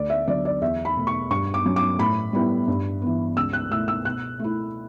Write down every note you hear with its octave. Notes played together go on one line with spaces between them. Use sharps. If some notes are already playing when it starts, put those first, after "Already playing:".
Already playing: D2 D5
E5
D3 F#3 D5
D5
E2 E5
B5
B2 A3
C#6
G2 C#6
D6
F#3 C#4
D6
A2 B5
G3 B3 E4
G2
E3 B3
C#2 E6
F#6
B2 A3 E4 E6
E6
B2 F#6
A3 E4